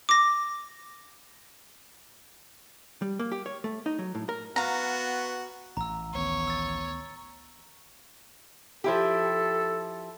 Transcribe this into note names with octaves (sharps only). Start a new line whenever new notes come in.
D6 A#6
G3
A#3
G4
C#5
A3
D#4
F#3
A2
A#4
B3 F#4 F5 A#5
A1 A#5 E6
D2 D#3 B3 C#5
E6 A6
F3 E4 G4 A4